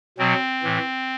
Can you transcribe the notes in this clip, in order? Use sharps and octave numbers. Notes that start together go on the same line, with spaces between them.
B2 F#3 C4
A2 E3